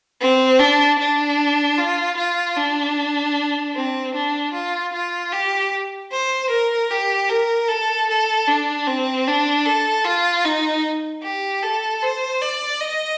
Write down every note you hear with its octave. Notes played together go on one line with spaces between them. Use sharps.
C4
D4
D4
F4
F4
D4
C4
D4
F4
F4
G4
C5
A#4
G4
A#4
A4
A4
D4
C4
D4
A4
F4
D#4
G4
A4
C5
D5
D#5